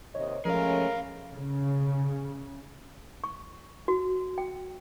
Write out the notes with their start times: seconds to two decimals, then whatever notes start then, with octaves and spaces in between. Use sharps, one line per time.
0.15 D#2 C3 C#5 D#5
0.45 F3 G#3 A3 C#4 G#4 A#4 F5
1.33 C#3
3.24 C#6
3.88 F#4
4.38 G5